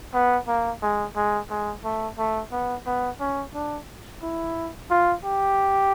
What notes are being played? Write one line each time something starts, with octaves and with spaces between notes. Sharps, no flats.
B3
A#3
G#3
G#3
G#3
A3
A3
B3
B3
C#4
D4
E4
F4
G4